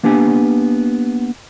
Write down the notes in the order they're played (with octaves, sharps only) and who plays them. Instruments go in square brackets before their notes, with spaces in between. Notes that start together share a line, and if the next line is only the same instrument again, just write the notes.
[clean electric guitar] A#3 B3 D4 G4 G#5